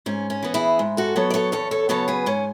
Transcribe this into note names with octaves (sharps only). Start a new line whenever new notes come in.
G#2 C#4
C#4
E3 B3
E4 G#4
G#2
F#4 A4
F#3 B3 A4 C#5
D5
A4 C#5
E2 A4 C#5
A4 C#5
C#3 F#3 B3 A4 C#5
G#4 B4
G#2 C#4